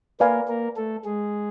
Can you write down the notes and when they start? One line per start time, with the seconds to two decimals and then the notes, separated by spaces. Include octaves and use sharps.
0.20 A#3 A#4 B4 D5 F5 G#5
0.48 A#3 A#4
0.77 A3 A4
1.05 G#3 G#4